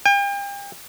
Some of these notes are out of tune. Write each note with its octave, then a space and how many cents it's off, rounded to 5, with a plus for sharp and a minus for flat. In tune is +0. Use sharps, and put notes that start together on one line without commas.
G5 +40